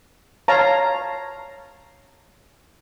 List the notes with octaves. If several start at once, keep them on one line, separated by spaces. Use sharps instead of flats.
C#5 F5 A5 A#5